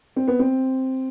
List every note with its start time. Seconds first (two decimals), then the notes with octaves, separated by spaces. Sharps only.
0.16 C4
0.28 B3
0.39 C4